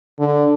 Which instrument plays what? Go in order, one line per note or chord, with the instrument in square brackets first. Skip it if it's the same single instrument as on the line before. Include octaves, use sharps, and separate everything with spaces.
[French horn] D3